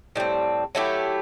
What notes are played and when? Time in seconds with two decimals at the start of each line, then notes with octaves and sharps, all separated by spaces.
0.16 A2 G3 C4
0.75 F#3 A3 E4 G4